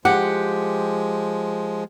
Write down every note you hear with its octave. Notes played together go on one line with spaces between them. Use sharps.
F3 G#3 G4 F#5